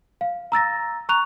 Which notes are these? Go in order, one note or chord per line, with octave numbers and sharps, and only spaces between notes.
F5
A#5 E6 A6 A#6
A#5 C#6 F#6 F7